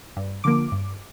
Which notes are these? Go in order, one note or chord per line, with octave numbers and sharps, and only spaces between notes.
G2
D3 F3 A#3 D6
G2